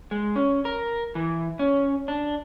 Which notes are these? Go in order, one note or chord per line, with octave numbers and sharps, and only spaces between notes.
G#3
C#4
A#4
E3
C#4
D4